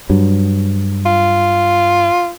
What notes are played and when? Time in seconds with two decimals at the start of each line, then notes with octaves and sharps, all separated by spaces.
0.09 G2 F#3
1.06 F4